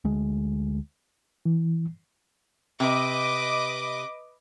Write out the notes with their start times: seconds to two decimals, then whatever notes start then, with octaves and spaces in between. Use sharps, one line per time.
0.05 D2 G#3
1.45 E3
2.80 C3 B4 D#5 D6